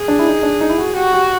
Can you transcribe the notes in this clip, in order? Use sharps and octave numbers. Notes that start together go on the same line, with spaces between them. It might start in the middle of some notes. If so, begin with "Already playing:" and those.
Already playing: G#4
D4
E4
D#4
D4
D#4
E4
F#4
F#4 G4
G4